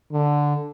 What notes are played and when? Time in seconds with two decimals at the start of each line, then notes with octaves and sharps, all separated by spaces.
0.12 D3